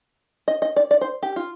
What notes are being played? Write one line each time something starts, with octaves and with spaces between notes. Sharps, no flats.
D#5
D#5
D5
D5
C5
G4
F4